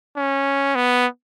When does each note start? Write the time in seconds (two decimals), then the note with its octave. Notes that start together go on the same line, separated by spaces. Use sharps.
0.17 C#4
0.76 B3